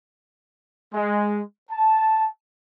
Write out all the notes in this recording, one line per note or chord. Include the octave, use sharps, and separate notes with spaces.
G#3
A5